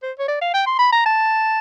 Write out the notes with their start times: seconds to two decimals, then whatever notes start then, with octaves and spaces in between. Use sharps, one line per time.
0.03 C5
0.19 C#5
0.28 D5
0.41 F5
0.54 G5
0.66 C6
0.79 B5
0.92 A#5
1.05 A5